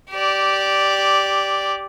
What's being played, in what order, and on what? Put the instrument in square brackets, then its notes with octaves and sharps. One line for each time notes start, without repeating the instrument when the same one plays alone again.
[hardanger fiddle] G4 D5